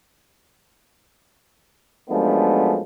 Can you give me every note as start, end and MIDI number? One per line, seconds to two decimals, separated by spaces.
2.10 2.81 42
2.10 2.81 53
2.10 2.81 56
2.10 2.81 57
2.10 2.81 59
2.10 2.81 62